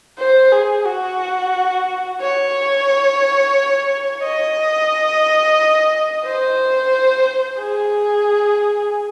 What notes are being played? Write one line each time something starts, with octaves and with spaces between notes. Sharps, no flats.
C5
G#4
F#4
C#5
D#5
C5
G#4